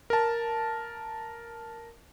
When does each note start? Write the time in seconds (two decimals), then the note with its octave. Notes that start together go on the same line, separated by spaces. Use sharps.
0.10 A#4 A5